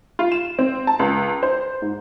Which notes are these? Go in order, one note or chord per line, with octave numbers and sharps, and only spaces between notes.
F4
E7
C4
A5
C#2
C5
G#2